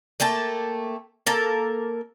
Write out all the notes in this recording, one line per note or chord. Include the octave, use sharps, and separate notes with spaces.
A3 A#3 G5 A5
A#3 A4 A#4